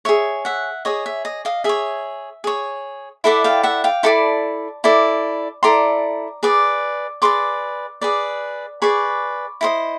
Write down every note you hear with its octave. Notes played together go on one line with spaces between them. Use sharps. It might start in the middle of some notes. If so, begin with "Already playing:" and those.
G#4 C#5 E5
E5 F#5
G#4 C#5 D#5
E5
D#5
D#5 F5
G#4 C#5 E5
G#4 C#5
E4 A4 D5 E5 F#5
F5 G5
E5 F#5
F5 G5
E4 A4 D5 A5 B5
E4 A4 D5
E4 A4 D5 A#5 C6
G#4 B4 D5
G#4 B4 D5 C6 D6
G#4 B4 D5
G#4 B4 D5 B5 C#6
E4 A4 C5 D#5